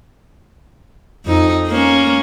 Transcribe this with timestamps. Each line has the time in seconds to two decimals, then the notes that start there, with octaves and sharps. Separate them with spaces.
1.26 F2 D#4
1.68 A#3 C#4